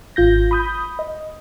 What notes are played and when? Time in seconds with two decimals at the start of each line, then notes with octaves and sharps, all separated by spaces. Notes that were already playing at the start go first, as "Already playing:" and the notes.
0.16 G#1 F4 G6 A#6
0.51 B5 D#6 G6
0.99 D#5